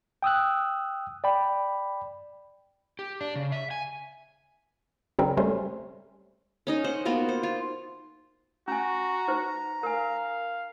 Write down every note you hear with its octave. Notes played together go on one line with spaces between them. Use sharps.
G5 D#6 E6 F#6
D5 G5 B5
G4
D4
C#3
E5
G#5
C#3 F#3 C4 D4 A#4 B4
G3 A3 C#4 C5
C#4 D#4 D#5
C5 F#5
A#3 B3 F4 F#4
C5
F4
C#4 F#4 G#5 A#5
D#4 B4 C5
A#4 F5 G#5